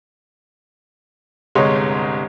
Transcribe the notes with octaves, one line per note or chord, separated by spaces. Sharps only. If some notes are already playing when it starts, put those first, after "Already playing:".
G1 C2 G#3 C#5 D#5 C6